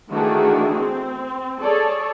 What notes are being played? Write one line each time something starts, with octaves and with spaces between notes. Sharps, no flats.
D#3 E3 A3 D4 F#4 G#4
C4
G#4 A4 C#5 D5